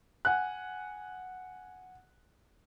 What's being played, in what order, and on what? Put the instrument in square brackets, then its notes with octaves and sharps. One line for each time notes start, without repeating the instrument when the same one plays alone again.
[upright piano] F#5 G#5 F#6